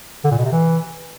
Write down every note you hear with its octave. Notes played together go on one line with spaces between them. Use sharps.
D3
A#2
B2
C3
E3